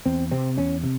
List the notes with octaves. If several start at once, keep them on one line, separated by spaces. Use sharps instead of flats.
E2 C4
C3 C4
E2 C#4
C3